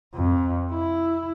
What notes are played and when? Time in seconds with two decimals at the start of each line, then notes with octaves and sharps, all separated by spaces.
0.15 F2
0.72 E4